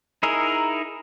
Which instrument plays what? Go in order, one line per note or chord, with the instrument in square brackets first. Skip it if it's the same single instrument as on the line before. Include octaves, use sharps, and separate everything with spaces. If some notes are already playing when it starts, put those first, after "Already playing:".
[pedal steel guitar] D#4 E4 G#4 A#4